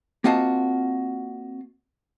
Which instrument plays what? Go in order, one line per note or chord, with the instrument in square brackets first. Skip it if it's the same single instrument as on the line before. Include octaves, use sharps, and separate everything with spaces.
[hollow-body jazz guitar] A#3 C4 F4 F#4 D#5 A5